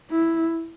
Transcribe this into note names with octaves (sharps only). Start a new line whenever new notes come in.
E4